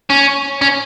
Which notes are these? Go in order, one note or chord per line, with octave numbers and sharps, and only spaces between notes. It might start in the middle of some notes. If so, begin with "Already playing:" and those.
C#4
C#4